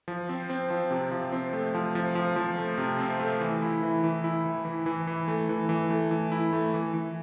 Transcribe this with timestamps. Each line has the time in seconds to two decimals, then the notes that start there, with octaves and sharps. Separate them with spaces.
0.08 F3
0.29 C4
0.50 C4
0.70 F3
0.91 C3
1.11 F3
1.33 C4
1.53 A3
1.74 F3
1.95 F3
2.15 F3
2.36 F3
2.58 A3
2.78 C3
2.99 C4
3.20 A3
3.41 E3
3.62 E4
3.83 E3
4.04 E3
4.24 E4
4.45 E3
4.65 E3
4.86 E3
5.07 E3
5.28 A3
5.49 E3
5.69 E3
5.90 A3
6.11 E3
6.32 E4
6.53 A3
6.74 E3
6.94 E3